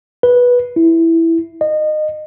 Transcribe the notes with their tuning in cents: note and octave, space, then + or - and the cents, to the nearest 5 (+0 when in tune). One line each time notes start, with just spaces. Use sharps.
B4 -10
E4 +0
D#5 -25